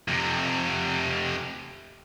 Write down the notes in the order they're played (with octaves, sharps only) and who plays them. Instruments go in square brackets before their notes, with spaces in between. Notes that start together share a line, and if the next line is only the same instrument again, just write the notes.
[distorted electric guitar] F2 C3